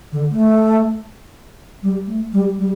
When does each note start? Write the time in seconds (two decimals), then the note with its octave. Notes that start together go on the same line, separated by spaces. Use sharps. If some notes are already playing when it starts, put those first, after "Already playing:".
0.12 D3
0.31 A3
1.83 G3
2.07 A3
2.33 G3
2.58 G3